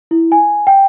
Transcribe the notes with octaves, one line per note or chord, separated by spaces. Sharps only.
E4
G#5
G5